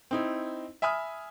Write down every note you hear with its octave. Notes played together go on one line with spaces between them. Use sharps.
C4 D#4 E4
E5 G#5 B5 D#6 F6